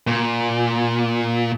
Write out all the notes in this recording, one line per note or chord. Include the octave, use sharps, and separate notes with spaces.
A#2